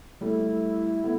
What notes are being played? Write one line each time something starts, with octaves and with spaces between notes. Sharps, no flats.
G3 A3 E4
A3 B3